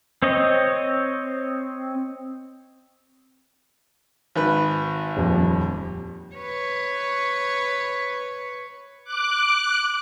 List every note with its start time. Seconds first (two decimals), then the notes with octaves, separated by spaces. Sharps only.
0.22 C4 C#5 D#5
4.36 G#1 B4
5.17 D#1 F2
6.36 B4 C#5
9.04 D6 F#6